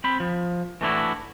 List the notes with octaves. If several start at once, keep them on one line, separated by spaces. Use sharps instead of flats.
C4 C5 B5
F3
E3 A3 D4 E4 F#4